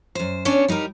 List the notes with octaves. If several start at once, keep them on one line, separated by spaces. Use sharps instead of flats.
F#2 C5
B3 C#4 D4 C#5
G3 D#4 G4 A#4